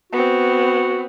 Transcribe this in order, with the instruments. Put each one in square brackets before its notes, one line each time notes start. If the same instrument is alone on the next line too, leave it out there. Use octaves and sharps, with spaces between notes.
[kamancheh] B3 C4 [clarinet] F#4